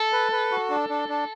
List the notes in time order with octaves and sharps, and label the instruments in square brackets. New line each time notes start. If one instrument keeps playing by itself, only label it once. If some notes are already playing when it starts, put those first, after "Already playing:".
Already playing: [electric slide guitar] A4
[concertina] B4
B4
F#4
D4
D4
D4